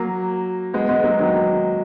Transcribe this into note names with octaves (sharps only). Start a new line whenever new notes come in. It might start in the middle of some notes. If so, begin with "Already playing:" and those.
Already playing: F#3 A#3
G#3 B3
G#3 B3
F#3 A#3
D#3 F#3